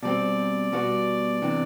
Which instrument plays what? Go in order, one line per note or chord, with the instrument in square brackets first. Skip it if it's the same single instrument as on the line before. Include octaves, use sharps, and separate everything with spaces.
[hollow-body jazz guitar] B2 G3 C4 [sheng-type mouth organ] D5
[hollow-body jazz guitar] B2 G3 B3 F#4
C3 E3 B3 D4